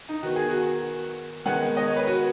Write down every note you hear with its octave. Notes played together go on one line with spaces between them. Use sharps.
D#4
D#3 B3 F#4
G#4
F#4
D#3 G#3 B3 F#5
D#5
C#5
B4
F#4